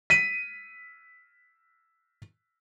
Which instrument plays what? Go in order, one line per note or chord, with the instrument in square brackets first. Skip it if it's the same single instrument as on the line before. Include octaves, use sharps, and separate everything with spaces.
[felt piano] B6 D#7